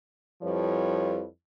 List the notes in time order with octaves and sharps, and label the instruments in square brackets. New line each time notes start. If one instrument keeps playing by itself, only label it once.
[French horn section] F2 F3 G3 E4 B4 C#5